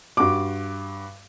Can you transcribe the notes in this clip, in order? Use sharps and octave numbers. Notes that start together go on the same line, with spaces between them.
G2 F#4 D6